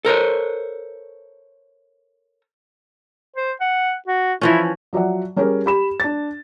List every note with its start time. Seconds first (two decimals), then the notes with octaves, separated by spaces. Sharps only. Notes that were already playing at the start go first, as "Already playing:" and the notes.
0.05 A4 A#4 C5 C#5
3.36 C5
3.61 F#5
4.08 F#4
4.41 E3 F3 C#4 E4
4.93 F3 F#3 D5 E5 F#5
5.36 G3 C#4 G4 G#4 A#4 C#5
5.66 G4 B5 E7
6.00 D4 A6